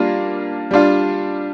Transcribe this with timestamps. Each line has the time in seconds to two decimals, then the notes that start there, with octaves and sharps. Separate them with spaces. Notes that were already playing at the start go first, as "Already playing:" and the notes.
Already playing: G3 A#3 D4 F4
0.71 G3 D4 F4